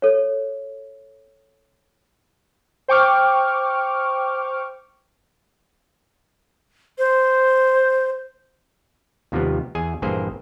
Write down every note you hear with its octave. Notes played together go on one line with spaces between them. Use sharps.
A4 C#5
C5 G5 C#6 D6 F6
C5
D#2 C3 F3 G3 B3
E2 G#4 G#5
A#1 G2 E3 A#3 G#4 C5